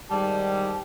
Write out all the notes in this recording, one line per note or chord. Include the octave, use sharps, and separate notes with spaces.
G#2 D#3 G3 A5